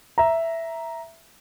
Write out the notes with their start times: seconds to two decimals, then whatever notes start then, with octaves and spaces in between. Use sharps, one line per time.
0.18 E5 A#5